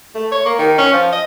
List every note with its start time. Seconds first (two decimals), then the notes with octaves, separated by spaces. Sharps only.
0.15 A3
0.32 C#5
0.45 A#3
0.58 D#3
0.78 C#4
0.93 F3
1.12 D#5